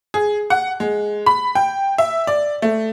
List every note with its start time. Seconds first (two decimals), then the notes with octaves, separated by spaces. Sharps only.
0.14 G#4
0.50 F#5
0.80 G#3
1.26 B5
1.55 G5
1.98 E5
2.27 D5
2.62 A3